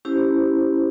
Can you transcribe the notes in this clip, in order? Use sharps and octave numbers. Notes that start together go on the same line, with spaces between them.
C#4 E4 G4 C5